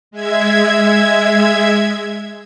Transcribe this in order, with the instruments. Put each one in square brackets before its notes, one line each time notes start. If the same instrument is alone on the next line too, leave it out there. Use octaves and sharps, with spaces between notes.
[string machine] G#3 E5 G#6